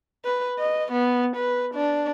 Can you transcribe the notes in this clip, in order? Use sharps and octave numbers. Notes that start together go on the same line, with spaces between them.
B4
D#5
B3
B4
D4